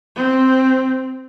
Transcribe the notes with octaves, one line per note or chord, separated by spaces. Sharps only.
C4